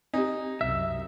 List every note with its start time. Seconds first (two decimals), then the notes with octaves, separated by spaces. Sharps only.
0.14 C4 D#4 G4
0.61 C2 F#2 E5